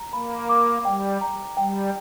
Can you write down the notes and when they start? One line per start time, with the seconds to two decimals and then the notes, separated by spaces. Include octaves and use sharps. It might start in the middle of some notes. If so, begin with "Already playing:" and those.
Already playing: A#5
0.13 A#3 B5
0.49 D6
0.85 G3 G5
1.21 A#5
1.57 G3 G5